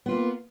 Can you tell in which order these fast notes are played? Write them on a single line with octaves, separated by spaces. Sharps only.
B3 F4 A#3